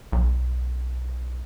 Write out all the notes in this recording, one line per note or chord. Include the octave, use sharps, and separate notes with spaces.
B1